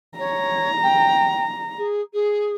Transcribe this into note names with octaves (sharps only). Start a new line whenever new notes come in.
C#5 A#5
G5
G#4
G#4